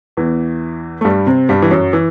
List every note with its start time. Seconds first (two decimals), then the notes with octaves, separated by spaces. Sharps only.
0.17 E2 E3
1.01 A3
1.05 G2 G3
1.27 C3 C4
1.49 G2 G3
1.62 E3
1.71 F#2 F#3
1.93 E3